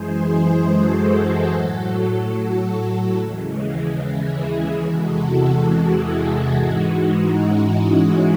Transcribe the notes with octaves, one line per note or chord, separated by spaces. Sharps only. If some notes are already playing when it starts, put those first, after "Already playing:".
Already playing: F#2 E3 G#3 G#4 C5
F#4 A4
A2 F#3 F#4 A4
F#4 A4
F#4 A4
F#4 A4
D#2 C#3 E3 G#3
E4 G#4
E2 C3 E3 G#3 F#4 A4
E4 G#4
G#2 E3 G#3 D#4 F#4
C#4 E4